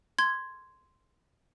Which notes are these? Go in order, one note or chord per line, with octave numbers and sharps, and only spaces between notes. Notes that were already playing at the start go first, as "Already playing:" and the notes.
C6 G#6